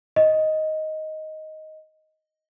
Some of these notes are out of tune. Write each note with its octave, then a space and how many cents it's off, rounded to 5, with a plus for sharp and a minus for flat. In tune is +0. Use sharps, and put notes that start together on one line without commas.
D#5 +5